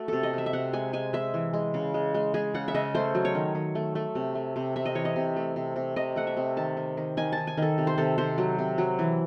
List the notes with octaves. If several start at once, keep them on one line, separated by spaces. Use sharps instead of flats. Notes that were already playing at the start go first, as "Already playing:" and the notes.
Already playing: A3 F#4
C3 A4
D#5
C3 E5
E5
C3 F#5
G#3 G#5
G#3 G#5
G#3 E5
E3
G#3
C#3
G#3
G#3
G#3 G#4
C#3 F#5
E5
C#3 D#5
A3 C5
F#3
C#5
D#3
D#3
A3
A3
C3
A3
C3
C3 E5
D#5
E3 C#5
D#5
C3
A3
C3
C3
C3 D#5
A3 F#5
E5
C3
D#3 A5
D#3
D#3
D#3 G#5
A5
D#3
G#5
D#3 A4
C3
C5
C3 A4
C3 C5
F#3
C3
F#3
E3